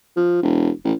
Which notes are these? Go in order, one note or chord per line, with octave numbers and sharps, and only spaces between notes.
F3
E1
A1